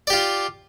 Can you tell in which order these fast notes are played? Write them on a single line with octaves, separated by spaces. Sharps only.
D5 G4 F4